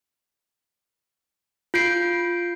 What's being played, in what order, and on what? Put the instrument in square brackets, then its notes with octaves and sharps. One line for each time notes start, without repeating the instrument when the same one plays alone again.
[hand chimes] F4 G6 C7 D7